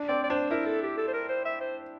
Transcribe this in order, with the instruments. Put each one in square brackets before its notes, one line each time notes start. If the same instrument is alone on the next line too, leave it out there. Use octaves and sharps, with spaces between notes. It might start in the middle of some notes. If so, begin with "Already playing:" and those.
Already playing: [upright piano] D4
[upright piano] C4 [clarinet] D5
[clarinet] D5
[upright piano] D4 [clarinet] C5
[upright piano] E4 [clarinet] A#4
[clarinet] A4
G4
A4
C5
A#4
C5
E5
C5